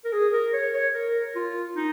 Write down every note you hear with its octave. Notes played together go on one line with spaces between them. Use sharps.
A#4
G#4
A#4
C#5
C#5
A#4
F4
D#4